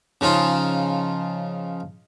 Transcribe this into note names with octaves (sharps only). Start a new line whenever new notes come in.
C#3 F3 D#4 F4